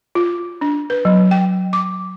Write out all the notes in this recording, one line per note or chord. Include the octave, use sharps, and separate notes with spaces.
F4
D4
B4
F#3
G5
D6